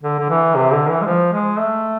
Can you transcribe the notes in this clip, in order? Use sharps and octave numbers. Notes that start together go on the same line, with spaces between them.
D3
D3
E3
C3
D3
E3
G#3
F3
G#3
A3